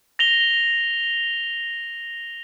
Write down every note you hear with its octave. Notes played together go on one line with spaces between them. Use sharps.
A#6 F7 G7